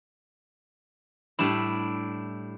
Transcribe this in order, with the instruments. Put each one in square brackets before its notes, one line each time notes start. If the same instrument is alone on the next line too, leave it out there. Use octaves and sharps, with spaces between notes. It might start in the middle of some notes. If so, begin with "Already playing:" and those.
[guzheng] A2 G3 D4 E4